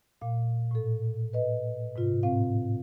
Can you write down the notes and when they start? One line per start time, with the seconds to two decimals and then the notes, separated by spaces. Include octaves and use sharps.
0.21 A#2 F5
0.71 A2 A4
1.33 B4 D#5
1.96 G#2 C3 F4
2.23 A2 C4 F5